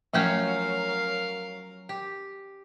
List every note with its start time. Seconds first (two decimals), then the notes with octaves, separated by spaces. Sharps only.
0.13 F3 F#3 A3 C#4 F4 A#4 F5
1.89 G4